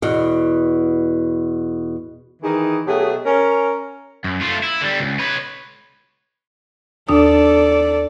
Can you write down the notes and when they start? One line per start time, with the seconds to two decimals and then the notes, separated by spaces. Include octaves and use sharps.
0.02 E2 B2
2.43 D#3 E3 D#4 G#4
2.87 B2 F#3 A3 G4 G#4
3.25 C#4 A#4
4.24 F#2
4.41 A3 F4
4.63 E4
4.81 D3 G3
5.00 C#2
5.19 B4 C#5
7.09 D#2 D4 A4 D5 D#6